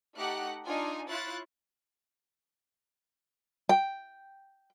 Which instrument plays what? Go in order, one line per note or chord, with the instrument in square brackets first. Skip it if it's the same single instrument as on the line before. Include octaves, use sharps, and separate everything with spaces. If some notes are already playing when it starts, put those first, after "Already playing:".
[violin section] A3 D#4 G4 F#5 F#6
D4 D#4 F4 G#5
E4 F4 C#5 F#6 A6
[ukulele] G5